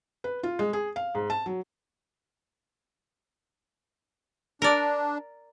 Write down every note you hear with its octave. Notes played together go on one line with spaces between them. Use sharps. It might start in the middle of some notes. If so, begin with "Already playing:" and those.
B4
F4
G#3
G#4
F5
G#2
A5
F#3
D4 A#4 D5